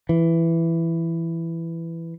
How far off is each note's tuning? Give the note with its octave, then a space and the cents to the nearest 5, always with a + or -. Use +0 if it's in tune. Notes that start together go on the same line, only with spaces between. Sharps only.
E3 +10